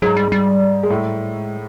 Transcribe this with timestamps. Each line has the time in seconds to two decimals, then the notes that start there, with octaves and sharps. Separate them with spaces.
0.02 G#2 F#3 G#3
0.17 G3
0.32 G3
0.83 G#3
0.90 A2 A3
1.34 G#3